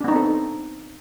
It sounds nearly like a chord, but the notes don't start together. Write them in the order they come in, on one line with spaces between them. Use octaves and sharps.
D4 B3 D#4 C4 A4